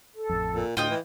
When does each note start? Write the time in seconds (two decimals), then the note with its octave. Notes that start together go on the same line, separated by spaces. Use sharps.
0.14 A4
0.29 A1 F2
0.53 A#2
0.77 D2 A2 F4 D#5 G5 D#6
0.90 E3